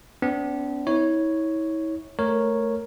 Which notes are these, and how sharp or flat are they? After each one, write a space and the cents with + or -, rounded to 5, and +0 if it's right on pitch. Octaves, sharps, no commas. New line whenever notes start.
B3 +40 D4 -40
E4 -40 C#5 +0
A3 +0 A#4 +0 C#5 -5